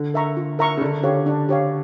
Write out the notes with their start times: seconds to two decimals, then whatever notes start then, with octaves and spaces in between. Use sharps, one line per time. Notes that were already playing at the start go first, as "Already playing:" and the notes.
Already playing: D3
0.14 A#4 E5 A#5 C#6
0.37 F4
0.59 A#4 E5 A#5 C#6
0.77 C#3
0.81 D3 D4
1.03 D3 G4 C#5 F5
1.26 D4
1.49 G4 C#5 F5